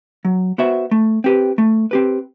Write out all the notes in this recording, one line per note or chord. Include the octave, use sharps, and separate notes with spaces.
F#3
B3 F#4 C5 E5
A3
C4 G4 B4
A3
C4 G4 B4